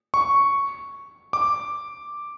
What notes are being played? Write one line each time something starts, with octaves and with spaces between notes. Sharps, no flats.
C#6
D6